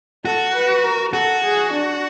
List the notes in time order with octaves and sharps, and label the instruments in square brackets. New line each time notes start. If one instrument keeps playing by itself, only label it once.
[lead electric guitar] F#4 [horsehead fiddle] A4
[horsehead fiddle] B4
A#4
[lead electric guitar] F#4 [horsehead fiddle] A4
[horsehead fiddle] G#4
D4